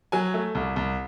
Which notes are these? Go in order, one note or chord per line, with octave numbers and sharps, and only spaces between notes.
F#3 G#5
A3
C2
C2